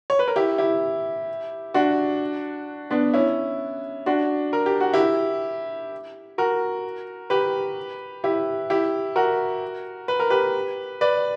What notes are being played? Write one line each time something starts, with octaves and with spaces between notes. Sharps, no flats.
C#5
B4
A#4
E4 G4
E4 G4
D4 F#4
B3 D4
C#4 E4
D4 F#4
A#4
G4
F#4
E4 G4
F#4 A#4
G4 B4
E4 G4
E4 G4
F#4 A#4
B4
A#4
G4 B4
B4 D5